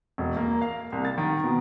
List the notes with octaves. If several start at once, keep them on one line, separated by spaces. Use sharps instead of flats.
E1
A#3
F5
C2
A6
D#3
B2